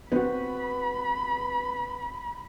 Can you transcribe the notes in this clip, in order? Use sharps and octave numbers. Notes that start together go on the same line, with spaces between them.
B3 C4 F#4 B5